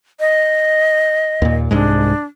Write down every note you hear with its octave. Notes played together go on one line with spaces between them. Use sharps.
D#5
D#2 A#2
C2 G#2 G#3 D4